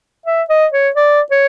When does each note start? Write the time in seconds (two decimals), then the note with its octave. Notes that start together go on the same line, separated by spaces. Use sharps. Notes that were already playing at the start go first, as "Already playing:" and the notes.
0.26 E5
0.50 D#5
0.73 C#5
0.96 D5
1.31 C#5